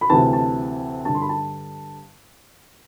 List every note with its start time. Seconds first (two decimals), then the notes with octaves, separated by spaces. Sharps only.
0.01 B5
0.10 D2 C3 E3 A5
0.33 A5
1.05 G2 D3 A5
1.15 C6
1.22 B5
1.29 A5